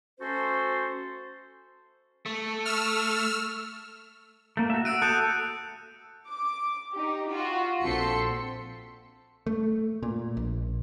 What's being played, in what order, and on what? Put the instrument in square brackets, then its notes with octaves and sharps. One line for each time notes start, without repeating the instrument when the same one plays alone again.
[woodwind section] A3 C#4 F#4 A4 C5
[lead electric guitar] A3
[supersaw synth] E6 F6
[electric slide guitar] A3 A#3
F#4 E5
[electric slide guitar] F#4 [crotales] E6 D7 D#7
[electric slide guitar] A4 [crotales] D#6 F#6 G6
[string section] D6
D#4 G4
F4 F#4
A#1 C4 A4 C6 B6 C#7
[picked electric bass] A3
A#2
A#1